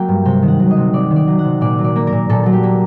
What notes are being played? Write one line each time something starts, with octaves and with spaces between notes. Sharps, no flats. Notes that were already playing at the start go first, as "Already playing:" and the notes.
Already playing: F#3 A#3 G5
G2
C3 G5
D#3
F#5
F#3
D#5
C3
C3 D5
D#3
D5
F#3
F#5
C3
A#2 D5
F#3
D5
A#3
A#4
A#2
A#2 A4
F#3 A4
G4
A#3